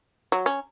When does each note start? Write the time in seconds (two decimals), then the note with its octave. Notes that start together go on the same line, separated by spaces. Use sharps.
0.32 F#3
0.46 C#4